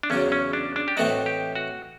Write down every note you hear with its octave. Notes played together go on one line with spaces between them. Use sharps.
D4
E2 C#3 F#3 C#4
C#4
D4
D4
G4
A2 E3 A3 C4 D#4 F#4
G4
F#4